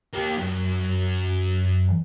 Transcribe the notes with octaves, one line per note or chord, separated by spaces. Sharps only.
A#3 G4
F#2